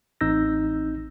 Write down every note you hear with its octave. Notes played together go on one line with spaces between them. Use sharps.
A1 C4 D#4 E6 G6 A#6